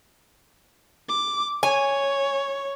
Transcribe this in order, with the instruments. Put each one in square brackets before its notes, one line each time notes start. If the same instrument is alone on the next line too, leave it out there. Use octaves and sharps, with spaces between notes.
[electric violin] D6
[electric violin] C#5 [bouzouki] G#5